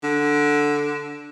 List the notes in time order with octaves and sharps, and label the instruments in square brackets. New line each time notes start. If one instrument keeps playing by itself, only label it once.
[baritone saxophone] D3